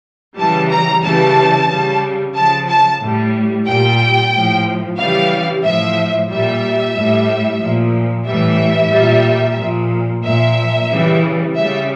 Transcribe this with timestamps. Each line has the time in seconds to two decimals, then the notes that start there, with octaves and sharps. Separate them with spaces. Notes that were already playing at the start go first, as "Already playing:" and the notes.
0.37 C#3 E3 G3 A5
0.70 A#5
1.04 C#3 E3 G3 A5
1.69 C#3 G3
2.34 C#3 F3 A5
2.68 A5
3.01 A2 G3
3.66 A#2 G3 G5
4.32 A2 F3
4.98 C#3 E3 G3 F5
5.63 A2 F3 E5
6.29 A#2 G3 E5
6.95 A2 G3
7.61 A#2 F3
8.26 A2 E3 G3 E5
8.92 A#2 G3
9.58 A#2 F3
10.24 A#2 F3 E5
10.90 C#3 E3 G3
11.55 C#3 G3 E5